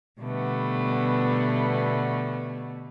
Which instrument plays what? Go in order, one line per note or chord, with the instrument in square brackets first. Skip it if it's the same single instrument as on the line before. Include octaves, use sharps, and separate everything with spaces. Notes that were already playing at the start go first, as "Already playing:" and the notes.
[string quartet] B2 D3 G3 A3 B3